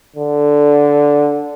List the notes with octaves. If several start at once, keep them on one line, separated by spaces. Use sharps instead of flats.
D3